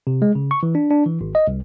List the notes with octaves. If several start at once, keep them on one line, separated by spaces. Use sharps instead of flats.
C3
G#3
C#3
C#6
E3
D4
D4
E3
G#1
D#5
C2